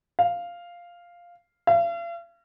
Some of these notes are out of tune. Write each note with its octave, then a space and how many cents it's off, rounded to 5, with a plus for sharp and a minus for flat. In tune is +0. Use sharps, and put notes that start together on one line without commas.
F5 +0
F5 -40